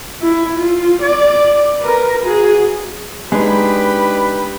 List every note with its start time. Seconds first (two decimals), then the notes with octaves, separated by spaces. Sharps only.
0.22 E4
0.58 F4
1.02 D5
1.81 A#4 B4
2.24 F#4 G#4
3.32 G#3 B3 D4 D#4 G4 B4 B5